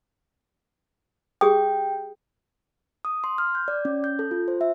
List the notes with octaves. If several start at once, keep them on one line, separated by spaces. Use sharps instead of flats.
G4 G#4 G5 D#6
D#6
C6
F6
G6
D5
C#4
G6
A4
F4
C5
E5